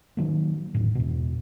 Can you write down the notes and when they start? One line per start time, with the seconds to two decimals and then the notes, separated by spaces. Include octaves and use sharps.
0.17 D#3 F#3 A#3
0.74 E1 D2 A2
0.95 E2 B2